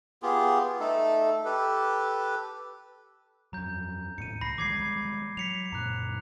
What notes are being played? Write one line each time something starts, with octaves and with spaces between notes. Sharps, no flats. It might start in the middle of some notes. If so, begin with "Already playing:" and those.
B3 F4 G4 G#4
A3 D#4 A4
G4 A4 B4
F2 F#3 A#5 G6
E1 A2 C#7 D#7
C#2 B5 A#6 C7
E3 G3 G#3 D6 G#6 C7
F#3 B6 C#7 F7
F#2 A#2 A#5 D6 F#6